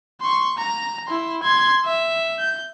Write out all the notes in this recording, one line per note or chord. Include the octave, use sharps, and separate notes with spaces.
C6 C#6
A#5
E4 C6
C6 G#6
E5
G6